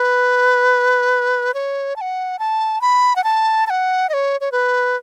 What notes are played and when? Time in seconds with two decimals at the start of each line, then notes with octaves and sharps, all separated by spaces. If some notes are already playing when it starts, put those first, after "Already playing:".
Already playing: B4
1.54 C#5
1.96 A5
2.01 F#5
2.39 A5
2.81 B5
3.16 F#5
3.24 A5
3.67 A5
3.70 F#5
4.09 D#5
4.13 C#5
4.41 C#5
4.52 B4